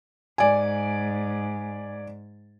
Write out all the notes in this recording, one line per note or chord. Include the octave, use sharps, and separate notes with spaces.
G#2 D5 G#5